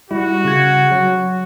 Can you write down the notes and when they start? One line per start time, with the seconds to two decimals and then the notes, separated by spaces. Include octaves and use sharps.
0.11 G3 E4 F#4
0.44 C#3 G#6
0.91 F#3